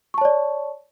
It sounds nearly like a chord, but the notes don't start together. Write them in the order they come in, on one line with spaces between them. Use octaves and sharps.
C#6 A5 C#5 D5